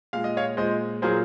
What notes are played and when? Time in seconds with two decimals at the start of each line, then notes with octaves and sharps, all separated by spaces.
0.13 A#2 G#3 F5
0.24 D#5
0.37 C#5 F5
0.57 A#2 G#3 C5 D#5
1.02 A#2 F#3 A#3 G#4 C5